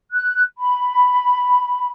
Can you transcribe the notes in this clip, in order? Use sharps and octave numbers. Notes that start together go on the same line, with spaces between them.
F#6
B5